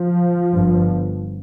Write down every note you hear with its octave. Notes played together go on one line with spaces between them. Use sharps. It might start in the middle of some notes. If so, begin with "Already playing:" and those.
Already playing: F3
G1 G2